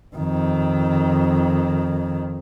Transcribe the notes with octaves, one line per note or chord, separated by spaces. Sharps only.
F2 D#3